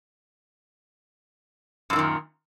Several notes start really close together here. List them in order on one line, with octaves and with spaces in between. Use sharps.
F#2 F3 D#3 A#2